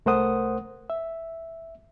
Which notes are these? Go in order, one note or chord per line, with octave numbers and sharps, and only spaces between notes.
C2 A3 A#4 C5 F#5 D#6
E5